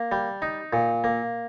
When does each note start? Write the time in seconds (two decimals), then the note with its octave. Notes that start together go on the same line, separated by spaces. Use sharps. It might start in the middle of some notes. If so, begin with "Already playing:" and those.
Already playing: A#3
0.12 G3
0.42 D#4
0.73 A#2
1.04 A#3